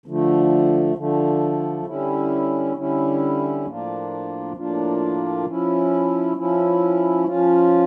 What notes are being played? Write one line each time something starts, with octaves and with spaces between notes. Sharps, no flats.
D3 F3 A3
D3 F3 A3
D3 G3 C#4 E4
D3 G3 C#4 E4
A2 F3 A#3 D4 F4
A2 F3 A#3 D4 F4
F3 C#4 E4
F3 C#4 E4
F3 C#4 F4